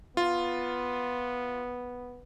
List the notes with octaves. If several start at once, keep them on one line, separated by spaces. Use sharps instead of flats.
B3 F4